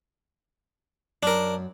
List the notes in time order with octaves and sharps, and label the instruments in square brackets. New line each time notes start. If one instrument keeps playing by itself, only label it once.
[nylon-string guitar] F#2 [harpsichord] D4 A#4